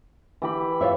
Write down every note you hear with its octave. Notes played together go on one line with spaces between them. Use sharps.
E3 G4 B5
F4 C#5 E5